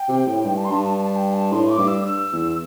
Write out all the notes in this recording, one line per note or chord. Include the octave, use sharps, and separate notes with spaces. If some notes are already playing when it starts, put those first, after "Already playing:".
Already playing: G5
C3
A2
G2 G5
A5
C6
G2 A5
A5
A5
G5
A5
A2 C6
D6
G2
E6
E6
E2